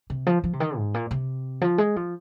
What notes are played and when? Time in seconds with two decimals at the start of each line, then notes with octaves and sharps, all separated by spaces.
0.10 C3
0.26 F3
0.44 F3
0.53 C3
0.60 D#3
0.77 G#2
0.94 A#2
1.11 C3
1.61 F3
1.78 G#3
1.96 F3